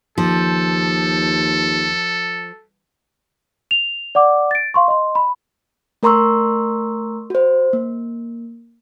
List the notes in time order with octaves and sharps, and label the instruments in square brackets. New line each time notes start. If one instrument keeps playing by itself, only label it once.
[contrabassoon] D#2 [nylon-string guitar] F3 [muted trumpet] A4
[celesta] F7
D5 F#5 D6
A6 D7
F5 C6 C#6
D#5 C6
B5
[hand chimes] A3 A#4 A#5 C6 C#6 E6
F#4 C5
A#3